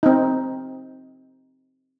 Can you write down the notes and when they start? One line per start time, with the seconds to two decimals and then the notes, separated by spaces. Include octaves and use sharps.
0.03 C4 D#4